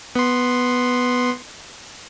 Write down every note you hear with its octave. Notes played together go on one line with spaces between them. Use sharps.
B3 C6